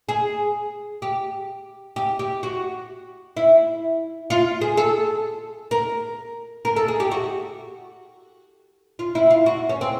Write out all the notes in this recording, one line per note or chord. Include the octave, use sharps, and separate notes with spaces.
G#4
G4
G4
G4
F#4
E4
F4
G#4
A4
A#4
A#4
A4
G#4
G4
F#4
F4
E4
F4
F#4
C#4
C4